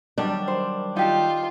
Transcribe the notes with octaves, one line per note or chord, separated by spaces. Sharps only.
D#3 F#3 G3 D4
C5
D#4 F4 G4 A5